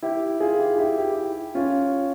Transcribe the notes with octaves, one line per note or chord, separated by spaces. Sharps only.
E4 G4
F4 G#4
E4 G4
E4 G4
E4 G4
C#4 F4